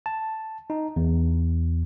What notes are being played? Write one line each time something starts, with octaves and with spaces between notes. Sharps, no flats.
A5
D#4
E2